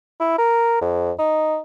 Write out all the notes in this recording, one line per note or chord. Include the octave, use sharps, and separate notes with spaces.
E4
A#4
F2
D#4